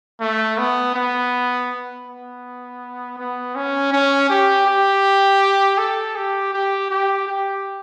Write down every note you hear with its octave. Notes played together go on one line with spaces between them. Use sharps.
A3
B3
B3
B3
B3
C#4
C#4
G4
G4
A4
G4
G4
G4
G4